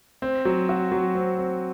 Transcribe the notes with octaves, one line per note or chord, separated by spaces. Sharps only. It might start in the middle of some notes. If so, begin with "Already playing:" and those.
C4
F#3
F#4
F#3
C4
C4